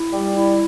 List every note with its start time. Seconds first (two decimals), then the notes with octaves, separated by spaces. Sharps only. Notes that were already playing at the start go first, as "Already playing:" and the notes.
Already playing: E4
0.12 G3
0.36 E4